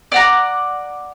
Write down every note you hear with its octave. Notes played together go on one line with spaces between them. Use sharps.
D5 F#5 A#5